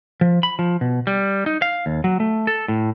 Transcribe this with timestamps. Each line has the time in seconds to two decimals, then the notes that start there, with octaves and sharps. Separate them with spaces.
0.21 F3
0.43 B5
0.59 F3
0.81 B2
1.07 G3
1.46 D#4
1.62 F5
1.86 D#2
2.04 F#3
2.20 A3
2.47 A4
2.68 A2